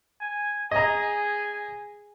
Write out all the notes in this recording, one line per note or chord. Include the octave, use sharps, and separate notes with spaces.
G#5
G#4 D#5 G#5 A#5